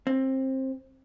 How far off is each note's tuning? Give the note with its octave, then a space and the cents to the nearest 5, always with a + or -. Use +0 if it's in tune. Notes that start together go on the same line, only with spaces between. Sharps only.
C4 +20